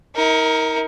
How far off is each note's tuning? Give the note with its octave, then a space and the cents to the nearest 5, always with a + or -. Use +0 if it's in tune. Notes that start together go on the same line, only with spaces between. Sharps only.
D#4 +45 A#4 +0